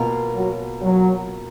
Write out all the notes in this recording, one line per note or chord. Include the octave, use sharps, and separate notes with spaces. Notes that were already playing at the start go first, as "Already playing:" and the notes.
Already playing: B2 A#3 F4 A#4
F#3
F#3